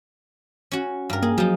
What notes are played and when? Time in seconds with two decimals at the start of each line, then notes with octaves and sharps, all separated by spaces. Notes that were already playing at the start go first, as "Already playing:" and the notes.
0.72 C#4 F#4
1.10 G2 A#4
1.22 A#3 G#4
1.38 F3 F#3 D#4